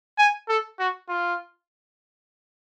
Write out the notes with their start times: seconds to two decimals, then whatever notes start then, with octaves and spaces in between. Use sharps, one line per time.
0.18 G#5
0.49 A4
0.79 F#4
1.09 F4